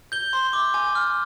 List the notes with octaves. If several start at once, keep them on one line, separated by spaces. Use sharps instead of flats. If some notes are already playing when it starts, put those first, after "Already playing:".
G6 G7
C6
D6
G#5
F6